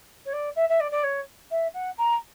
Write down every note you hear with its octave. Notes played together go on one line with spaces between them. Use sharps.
C#5
D5
E5
E5
D5
D5
C#5
E5
F#5
A#5